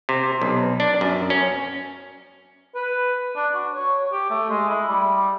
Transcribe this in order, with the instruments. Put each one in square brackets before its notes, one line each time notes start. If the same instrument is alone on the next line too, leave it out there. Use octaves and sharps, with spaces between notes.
[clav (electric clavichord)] C3
B1
D4
F#2
C#4
[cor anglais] B4
D4
F#4
C#5
G4
A3
G#3
E4
G3